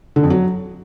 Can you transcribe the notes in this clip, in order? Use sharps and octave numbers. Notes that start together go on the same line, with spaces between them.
D3
F2
F#3